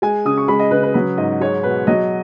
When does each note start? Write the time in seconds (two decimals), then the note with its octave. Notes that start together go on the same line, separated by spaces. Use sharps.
0.02 G#3 G#5
0.25 C#3 D#6
0.38 C#6
0.48 G#3 B5
0.59 D#5
0.71 C#3 B4
0.83 B4
0.94 F#3 B4
1.18 G#2 D#5
1.41 G#3 C#5
1.63 B2 B4
1.87 F#3 D#5